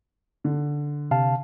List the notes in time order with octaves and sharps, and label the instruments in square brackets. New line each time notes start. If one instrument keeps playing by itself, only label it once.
[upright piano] D3
[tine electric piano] C3 F5 A5